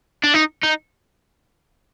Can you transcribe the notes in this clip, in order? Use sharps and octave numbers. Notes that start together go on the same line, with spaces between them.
D4
D#4
D#4